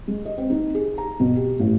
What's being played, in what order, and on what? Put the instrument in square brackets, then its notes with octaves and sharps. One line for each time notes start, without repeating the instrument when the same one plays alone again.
[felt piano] G#3
D#5
C4
D#4
G#4
A#5
B2
G4
A1